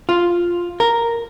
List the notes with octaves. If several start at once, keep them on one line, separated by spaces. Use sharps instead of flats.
F4
A#4